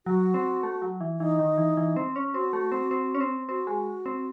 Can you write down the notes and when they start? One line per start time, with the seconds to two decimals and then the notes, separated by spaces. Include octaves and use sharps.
0.06 F#3 F#4
0.34 C4
0.63 A3
0.82 F#3
1.01 E3
1.19 E3 D#4
1.39 D#3
1.57 E3
1.77 E3
1.96 C4
2.16 C#4
2.34 C4 F#4
2.53 A3
2.72 C4
2.91 C4
3.15 C#4
3.20 C4
3.49 C4 F#4
3.67 G#3
4.06 C4